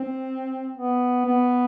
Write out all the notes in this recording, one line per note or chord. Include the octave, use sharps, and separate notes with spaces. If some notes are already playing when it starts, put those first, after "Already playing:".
Already playing: C4
B3
B3